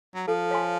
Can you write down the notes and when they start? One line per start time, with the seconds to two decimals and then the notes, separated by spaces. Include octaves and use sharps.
0.15 F#3
0.28 F3 A4
0.51 C#5 F5 G#5 C6